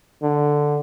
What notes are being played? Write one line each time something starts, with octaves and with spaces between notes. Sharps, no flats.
D3